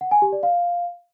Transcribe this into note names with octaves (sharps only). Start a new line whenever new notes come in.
F#5
G#5
G4
D5
F5